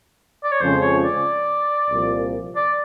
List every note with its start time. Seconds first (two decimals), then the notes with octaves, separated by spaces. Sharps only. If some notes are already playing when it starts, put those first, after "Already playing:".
0.44 D5
0.52 C#5
0.61 F2 C#3 F3 G#3 C#4 C5
0.81 C#5
1.04 D5
1.91 C2 A#2 F3
2.56 D5